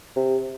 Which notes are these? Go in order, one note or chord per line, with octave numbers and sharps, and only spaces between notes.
C3